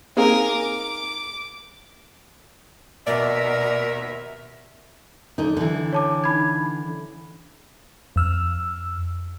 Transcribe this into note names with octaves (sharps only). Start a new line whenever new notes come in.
A#3 C4 D#4 G#4 A#4 F5 G#5
D6
D#2 B2 A#4 D5 E5
D3 D#4
D3 E3
C#5 A5 D6
D#4 B5 G#6
F2 E6 F6